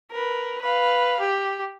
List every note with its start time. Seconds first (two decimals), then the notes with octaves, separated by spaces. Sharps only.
0.12 A#4 B4
0.62 B4 F5
1.20 G4